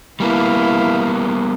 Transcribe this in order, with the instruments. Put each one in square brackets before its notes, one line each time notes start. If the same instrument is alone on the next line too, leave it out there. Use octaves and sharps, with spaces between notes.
[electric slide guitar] G3 A#3 B3 [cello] E4 F5